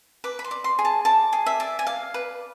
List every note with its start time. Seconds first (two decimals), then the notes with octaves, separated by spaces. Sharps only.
0.24 B4 D6
0.39 B5
0.44 C6
0.51 D5
0.64 C6
0.79 G#4
0.85 A5
1.05 D5 A5
1.33 G#4
1.46 E5
1.60 D5
1.79 G#5
1.87 D5 F5
2.14 B4